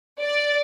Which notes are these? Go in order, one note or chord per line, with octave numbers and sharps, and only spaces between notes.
D5